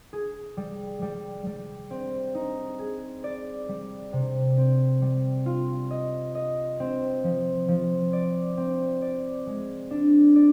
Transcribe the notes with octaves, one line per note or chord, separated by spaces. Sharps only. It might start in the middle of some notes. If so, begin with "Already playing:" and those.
G#4
G3
G3
G3
C4
D#4
G#4
D5
G3
C3
C4
G3
F4
D#5
D#5
C4
F3
F3
D5
C4
D5
G#3
D4
D5